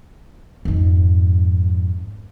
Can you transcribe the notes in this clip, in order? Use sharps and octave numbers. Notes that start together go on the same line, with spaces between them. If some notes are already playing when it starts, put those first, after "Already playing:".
F2 G#2